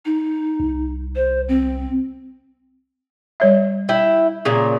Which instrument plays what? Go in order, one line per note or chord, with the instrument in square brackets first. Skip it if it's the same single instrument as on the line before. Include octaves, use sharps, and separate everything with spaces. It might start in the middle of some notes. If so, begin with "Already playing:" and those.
[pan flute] D#4
[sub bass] C2
[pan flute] C5
C4
[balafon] G3 C#5 E5
[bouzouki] E4 G5
A#2 C#3